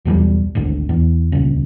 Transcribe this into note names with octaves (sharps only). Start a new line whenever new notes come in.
B1 E2 F3 G3
G#1 D2
E2
D#1 C#2